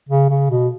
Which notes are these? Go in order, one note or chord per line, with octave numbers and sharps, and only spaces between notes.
C#3
C#3
B2